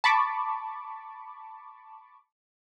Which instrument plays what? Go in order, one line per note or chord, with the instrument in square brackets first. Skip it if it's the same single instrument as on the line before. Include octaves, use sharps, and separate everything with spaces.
[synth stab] A5 B5 C#6 D6